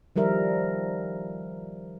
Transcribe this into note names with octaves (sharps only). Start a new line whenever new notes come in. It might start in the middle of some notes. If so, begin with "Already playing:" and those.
D#3 F3 G3 A#4 E5